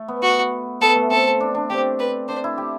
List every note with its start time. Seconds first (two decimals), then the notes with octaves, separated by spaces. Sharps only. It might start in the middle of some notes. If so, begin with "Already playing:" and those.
Already playing: A3
0.08 B3
0.23 F#4
0.81 B3 A4
0.96 A3
1.11 C4 A4
1.40 D4
1.55 D4
1.70 C4 G4
2.00 B4
2.28 D4 C5
2.44 E4
2.58 G4